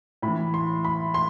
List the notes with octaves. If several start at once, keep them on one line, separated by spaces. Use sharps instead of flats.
A2 B5
E3
C6
B5
C6